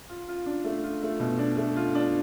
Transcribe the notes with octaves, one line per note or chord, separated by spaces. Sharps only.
F4
F4
D4
A3
F4
A3
B2
D4
A3
F4
D4